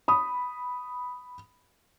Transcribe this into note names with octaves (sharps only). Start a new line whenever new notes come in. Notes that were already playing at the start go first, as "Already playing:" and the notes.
B5 D#6